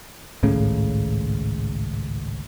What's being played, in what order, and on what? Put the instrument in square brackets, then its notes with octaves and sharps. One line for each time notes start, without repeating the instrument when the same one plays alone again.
[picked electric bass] G#1 C#2 A2 C#3